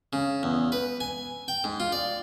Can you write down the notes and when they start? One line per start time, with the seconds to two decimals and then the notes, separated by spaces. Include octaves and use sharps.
0.13 C#3
0.43 E2
0.72 B4
1.00 G#5
1.48 G5
1.64 G#2
1.80 F4
1.92 D5